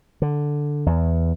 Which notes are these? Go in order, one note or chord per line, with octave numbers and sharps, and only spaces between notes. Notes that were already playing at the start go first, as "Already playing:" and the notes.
D3
E2